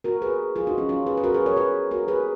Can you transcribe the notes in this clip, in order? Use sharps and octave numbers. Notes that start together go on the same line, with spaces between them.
F#4 A#4
G#4 B4
F4 G#4
D#4 F#4
C#4 F4
C#4 F4
G#4 B4
B4
F#4 A#4
G#4 B4
A#4 C#5
G#4 B4
F#4 A#4
G#4 B4